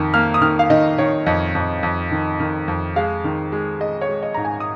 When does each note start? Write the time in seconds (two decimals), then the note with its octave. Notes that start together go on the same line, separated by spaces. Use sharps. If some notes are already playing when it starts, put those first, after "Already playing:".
Already playing: F2 D#3
0.14 A#3 F6
0.34 D#6
0.41 D#3 F6
0.59 F5
0.70 D#3 D#5
0.98 D#3 C#5
1.26 F2 D#5
1.55 F2
1.83 F2
2.11 D#3
2.40 D#3
2.68 F2
2.96 G#3 F5
3.24 D#3
3.52 G#3
3.80 G#3 D#5
4.01 C#5
4.08 G#3
4.23 D#5
4.34 G#2 A#5
4.45 G#5
4.60 D#6